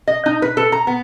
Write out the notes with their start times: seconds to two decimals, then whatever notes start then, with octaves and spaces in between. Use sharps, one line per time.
0.08 D#5
0.26 D#4
0.42 B4
0.57 A4
0.72 A#5
0.87 B3